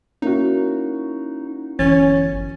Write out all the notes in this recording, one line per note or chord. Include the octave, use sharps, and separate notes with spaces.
A#3 C#4 D#4 E4 F#4
G1 F#2 E3 C#4 A6